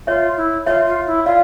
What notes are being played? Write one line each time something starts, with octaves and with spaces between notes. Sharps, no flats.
F4 C#5 E5
E4
F4 C#5 E5
F4
E4
F4 D5 F5